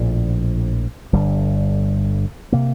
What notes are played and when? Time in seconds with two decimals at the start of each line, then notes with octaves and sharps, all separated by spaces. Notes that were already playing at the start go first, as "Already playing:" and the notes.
Already playing: A#1 A2 F3
1.13 G1 G2 D3 G3
2.52 C3 A#3